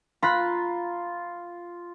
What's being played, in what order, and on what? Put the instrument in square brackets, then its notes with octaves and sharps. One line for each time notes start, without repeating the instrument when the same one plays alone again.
[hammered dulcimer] F4 [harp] A#5 B5 F#6